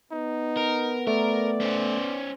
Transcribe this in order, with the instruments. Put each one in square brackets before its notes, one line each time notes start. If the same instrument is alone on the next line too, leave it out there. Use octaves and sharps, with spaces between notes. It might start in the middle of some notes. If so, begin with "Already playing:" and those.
[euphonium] B3 [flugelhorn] D#4
[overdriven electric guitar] A#4
[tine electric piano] A3 [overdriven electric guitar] A#4 [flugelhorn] D5
[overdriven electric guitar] C#4 C5